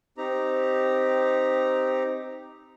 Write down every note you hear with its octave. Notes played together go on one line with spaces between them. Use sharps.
C4 D#4 G4 A#5